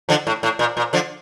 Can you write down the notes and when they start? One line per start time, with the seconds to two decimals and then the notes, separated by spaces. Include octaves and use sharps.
0.09 D3 F3
0.27 A2
0.43 A2
0.59 A#2
0.77 A#2
0.93 D3 F3